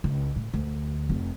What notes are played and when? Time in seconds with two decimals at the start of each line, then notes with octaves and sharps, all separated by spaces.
0.04 C#2
0.36 A2
0.54 D2
1.09 F1 E4